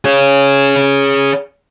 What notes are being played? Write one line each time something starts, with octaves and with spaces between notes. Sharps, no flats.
G#4 C#5